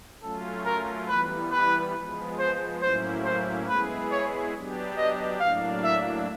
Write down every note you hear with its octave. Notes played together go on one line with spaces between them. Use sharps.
F#3 A3 C#4 F4 A4
A#4
E3 G3 B3 B4
B4
F3 G#3 B3
C5
A2 F#3 A#3 C#4 E4 C5
C5
G#3 B3 E4 G#4 B4
C#5
F#3 B3 D4 G4
D#5
A2 F#3 A#3 D4 F5
E5